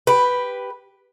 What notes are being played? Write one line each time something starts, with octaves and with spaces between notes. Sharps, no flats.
G4 B4